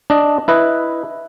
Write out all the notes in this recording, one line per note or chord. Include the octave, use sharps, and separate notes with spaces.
D4 D#5
E4 B4 D#5